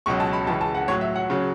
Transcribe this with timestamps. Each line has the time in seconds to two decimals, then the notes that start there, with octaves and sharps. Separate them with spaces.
0.06 C#2 B2 F#3 C#6
0.20 A5
0.33 B5
0.47 C#2 C#3 E3 A5
0.61 A5
0.75 F#5
0.88 A2 F#3 C#5
1.01 E5
1.16 F#5
1.30 C#3 F#3